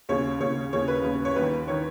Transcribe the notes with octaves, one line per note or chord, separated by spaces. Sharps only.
D#2 C#3 C#5
D#2 C#3 C#5
D#2 C#3 C#5
B4
D#2 C#3
C#5
D#2 D#3 B4
D#3 C#5